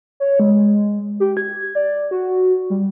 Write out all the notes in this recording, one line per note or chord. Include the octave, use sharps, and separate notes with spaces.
C#5
G#3
G4
G#6
D5
F#4
G3